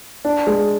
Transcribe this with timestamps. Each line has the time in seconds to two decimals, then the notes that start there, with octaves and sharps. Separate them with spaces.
0.25 D4
0.47 G#3